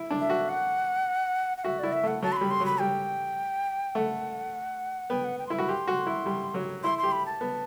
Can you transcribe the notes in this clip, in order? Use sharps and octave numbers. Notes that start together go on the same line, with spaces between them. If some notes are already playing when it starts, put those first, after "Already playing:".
Already playing: E4
D4
E5
F#4
F#5
F#5
F#4 E5
E4 D5
E5
A3 F#5
F#3 A5
C6
G3 B5
C6
F#3
B5
G3 G5
A3 F#5
B3 G5
F#5
G5
C6
E4 B5
F#4
G4 C6
F#4
E4
G3
F#3
E4 C6
G4 C6
B5
A5
B3